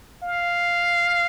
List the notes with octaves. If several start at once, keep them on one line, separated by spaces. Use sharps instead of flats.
F5